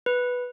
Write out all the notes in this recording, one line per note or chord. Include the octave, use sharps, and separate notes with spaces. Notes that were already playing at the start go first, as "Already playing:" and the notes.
B4